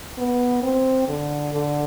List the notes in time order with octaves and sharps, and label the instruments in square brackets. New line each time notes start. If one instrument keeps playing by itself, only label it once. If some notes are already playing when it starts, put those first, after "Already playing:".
[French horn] B3
C4
D3
D3